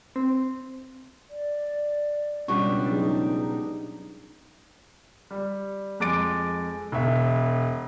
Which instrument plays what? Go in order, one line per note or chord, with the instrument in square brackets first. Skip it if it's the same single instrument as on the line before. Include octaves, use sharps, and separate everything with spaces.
[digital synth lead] C4
[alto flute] D5
[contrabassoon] C#2 [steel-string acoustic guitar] B2 G3 D4 [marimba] C#6
[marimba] F#3 G#4 [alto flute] D#4
[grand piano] G3
F2 G#3 D6 A6 D7
E1 E5